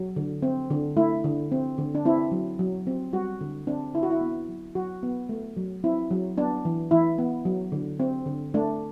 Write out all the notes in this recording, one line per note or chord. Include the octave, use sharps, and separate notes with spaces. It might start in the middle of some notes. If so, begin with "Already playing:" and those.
Already playing: F#3
D3
C4
D3
A3 E4
D3
C4
D3
D4
C4 E4
F#3
F#3
C4
G3 F#4
D3
C4 D4
D3 E4
F#4
E4
B3
F#3
F#3 F#4
B3
A3
F#3
C4 E4
F#3
B3 D4
E3
E3 E4
B3
F#3
D3
C4
D3
A3 D4